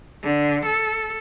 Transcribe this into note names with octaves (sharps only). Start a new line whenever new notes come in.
D3
A4